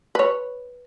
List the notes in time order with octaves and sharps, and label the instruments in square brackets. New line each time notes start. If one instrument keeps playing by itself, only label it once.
[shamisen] B4 C#5